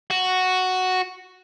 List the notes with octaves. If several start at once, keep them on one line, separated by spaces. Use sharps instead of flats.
F#4